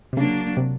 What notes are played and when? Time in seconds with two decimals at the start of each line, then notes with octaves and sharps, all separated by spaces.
0.13 C3
0.17 C#3 F#3 A#3 D4
0.57 C3